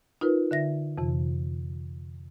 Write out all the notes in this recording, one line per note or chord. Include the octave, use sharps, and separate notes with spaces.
D#4 F4 A#4 B4
D3 E5 A#6
F2 C3 E3